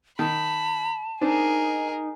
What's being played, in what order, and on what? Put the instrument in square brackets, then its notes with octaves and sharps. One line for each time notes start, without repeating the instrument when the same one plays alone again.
[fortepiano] D#3 [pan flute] A5 [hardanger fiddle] B5
[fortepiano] C4 D4 [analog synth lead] D#4 [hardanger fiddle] G#4 A#4